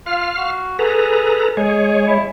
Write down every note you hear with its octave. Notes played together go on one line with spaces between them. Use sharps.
F4 F5 F6
F#4
G#4 A4 B4 A#5
G#3 G#4 C#5
E4